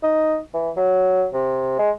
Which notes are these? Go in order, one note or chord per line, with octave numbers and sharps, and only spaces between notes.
D#4
E3
F#3
C3
G#3